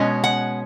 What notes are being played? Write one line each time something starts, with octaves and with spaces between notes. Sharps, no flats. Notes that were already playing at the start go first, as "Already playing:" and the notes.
Already playing: B2 G#3 C#4
F#5